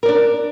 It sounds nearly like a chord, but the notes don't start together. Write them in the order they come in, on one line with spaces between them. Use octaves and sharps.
A#4 D5 D4